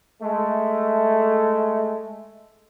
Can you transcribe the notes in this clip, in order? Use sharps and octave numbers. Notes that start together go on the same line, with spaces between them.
G#3 A3